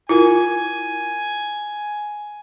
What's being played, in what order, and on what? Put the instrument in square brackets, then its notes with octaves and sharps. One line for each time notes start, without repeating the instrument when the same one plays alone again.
[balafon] E4 F4 A#4 [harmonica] G#5